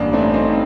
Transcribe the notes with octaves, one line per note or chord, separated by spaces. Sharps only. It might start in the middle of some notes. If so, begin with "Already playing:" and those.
Already playing: A1 G2 A#3 D4
A3 C4
C4 D#4